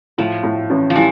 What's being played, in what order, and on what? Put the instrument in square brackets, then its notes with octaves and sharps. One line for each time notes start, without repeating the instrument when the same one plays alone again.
[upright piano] A2 [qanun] F3
[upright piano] A2
A1
[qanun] F3
[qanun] E3 [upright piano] G3